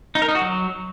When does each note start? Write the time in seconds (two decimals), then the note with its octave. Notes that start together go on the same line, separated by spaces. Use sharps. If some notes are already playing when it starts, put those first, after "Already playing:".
0.15 D#4
0.22 A#4
0.28 D#4
0.35 F#4
0.42 F#3